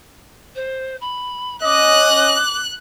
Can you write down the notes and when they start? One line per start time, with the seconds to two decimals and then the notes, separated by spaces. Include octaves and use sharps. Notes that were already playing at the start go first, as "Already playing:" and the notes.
0.55 C5
1.01 B5
1.64 C#4 D#5 D6 F#6